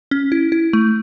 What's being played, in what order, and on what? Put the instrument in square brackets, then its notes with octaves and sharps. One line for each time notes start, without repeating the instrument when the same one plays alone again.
[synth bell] C#4
E4
E4
A3